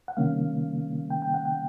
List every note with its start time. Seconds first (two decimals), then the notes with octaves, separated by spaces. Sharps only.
0.08 F#5
0.17 C3 D#3 G3 A#3 C#4 F5
1.10 G5
1.22 G5
1.34 F#5
1.45 G5